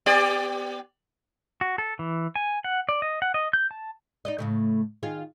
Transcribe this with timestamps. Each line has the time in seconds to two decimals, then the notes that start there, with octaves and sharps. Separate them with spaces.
0.06 B3 G4 D5
1.61 F#4
1.78 A4
1.99 E3
2.36 G#5
2.64 F#5
2.89 D5
3.02 D#5
3.22 F#5
3.34 D#5
3.53 G6
3.71 A5
4.25 D#4 D5 D#5
4.39 A2 C#3 A3
5.03 D#3 F4 G#4